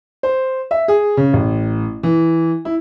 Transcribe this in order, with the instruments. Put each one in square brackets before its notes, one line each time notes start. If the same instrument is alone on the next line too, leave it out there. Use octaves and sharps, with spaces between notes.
[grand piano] C5
E5
G#4
C#3
A1
E3
E4